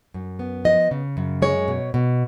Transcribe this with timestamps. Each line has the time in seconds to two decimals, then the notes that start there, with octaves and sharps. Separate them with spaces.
0.14 F#2
0.39 B3
0.65 F3 D#5
0.91 C#3
1.17 F#2
1.42 G#3 C#5
1.68 B2
1.94 B2